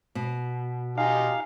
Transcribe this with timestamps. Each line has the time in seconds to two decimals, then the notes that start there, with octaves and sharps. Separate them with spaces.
0.15 B2
0.98 D#4 F4 G4 F5 G#5